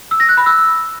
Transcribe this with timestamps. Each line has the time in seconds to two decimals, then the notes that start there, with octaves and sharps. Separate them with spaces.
0.11 E6
0.20 A#6
0.29 F#6
0.37 B5
0.46 E6